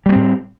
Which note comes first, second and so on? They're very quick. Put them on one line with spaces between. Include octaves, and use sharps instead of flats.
G3 A3 C4 A2